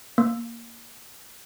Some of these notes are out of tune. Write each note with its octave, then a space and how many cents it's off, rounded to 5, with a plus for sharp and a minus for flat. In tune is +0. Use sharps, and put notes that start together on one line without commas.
A#3 +0